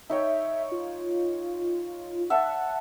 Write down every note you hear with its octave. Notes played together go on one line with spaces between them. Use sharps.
D#4 C#5 E5 G5
F4
E5 F#5 A5